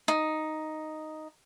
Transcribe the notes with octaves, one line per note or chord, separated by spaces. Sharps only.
D#4